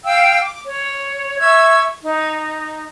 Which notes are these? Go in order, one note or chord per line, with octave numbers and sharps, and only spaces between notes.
F5 G5 E6
D6
C#5
E5 C#6 E6 G#6
D#4